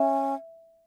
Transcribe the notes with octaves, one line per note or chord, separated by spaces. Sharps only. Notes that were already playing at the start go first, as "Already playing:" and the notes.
Already playing: C#4 E5